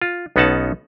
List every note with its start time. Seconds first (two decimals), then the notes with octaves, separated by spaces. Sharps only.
0.02 F4
0.36 B1 B3 C#4 D#4 F#5 A5